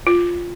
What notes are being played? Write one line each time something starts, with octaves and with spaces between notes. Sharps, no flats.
F4